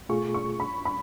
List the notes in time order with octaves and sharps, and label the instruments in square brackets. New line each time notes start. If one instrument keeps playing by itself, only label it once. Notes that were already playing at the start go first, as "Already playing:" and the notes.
[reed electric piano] B2 A3 F4 G#4 [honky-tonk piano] C#6
[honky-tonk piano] C#6
B5
B5